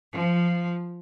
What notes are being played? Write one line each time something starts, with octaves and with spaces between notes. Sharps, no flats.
F3